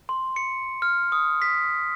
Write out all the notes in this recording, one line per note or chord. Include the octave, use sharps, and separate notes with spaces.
C6
C#7
F6
D#6
B6